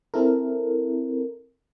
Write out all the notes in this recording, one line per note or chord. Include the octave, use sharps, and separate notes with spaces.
C4 E4 A4 A#4